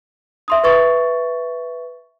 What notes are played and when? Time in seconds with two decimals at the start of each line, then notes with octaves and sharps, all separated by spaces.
0.48 E5 C6 D#6
0.64 B4 E5 C#6 A6